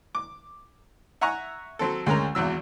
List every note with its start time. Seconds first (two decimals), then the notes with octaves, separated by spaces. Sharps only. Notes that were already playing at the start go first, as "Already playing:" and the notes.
0.15 D6
1.21 E5 F#5 G#5 A#5 C#6
1.79 F#3 C4 A4
2.06 D2 G#3 C#4 A#4 A#5
2.35 G#1 E2 F#3 E6